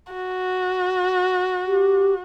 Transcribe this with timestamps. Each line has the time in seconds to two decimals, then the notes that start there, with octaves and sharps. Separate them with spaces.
0.13 F#4
1.67 G4